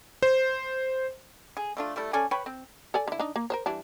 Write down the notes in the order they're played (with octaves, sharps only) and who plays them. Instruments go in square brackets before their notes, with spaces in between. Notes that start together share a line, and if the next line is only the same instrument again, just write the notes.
[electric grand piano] C5
[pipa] G#4
A3 D4 F4
G3 A3 E4
C#4 A4 D5 G#5
B4 C#5 G5 B5
C4
[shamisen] A4 D5 G#5
D3 E4
D4 D#4
A#3
A#4 C5 C#5
E3 G3 D4